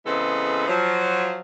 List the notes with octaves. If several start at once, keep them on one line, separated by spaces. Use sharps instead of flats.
C#3 E3 G#3 B3 C4 A4
F3 F#3